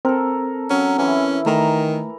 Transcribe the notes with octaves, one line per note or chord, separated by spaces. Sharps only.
C4 A4 A#4
F#3 C#4
E3 C#4 E4
D#3 A3 A#5